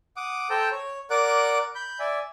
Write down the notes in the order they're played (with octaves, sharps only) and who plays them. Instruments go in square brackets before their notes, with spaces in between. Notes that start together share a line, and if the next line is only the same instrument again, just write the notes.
[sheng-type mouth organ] F#5 D6 D#6
A4 C5 G5 A5 A#5
C#5
A#4 D5 F#5 D6 F#6
B5 G6
D5 E5 G#5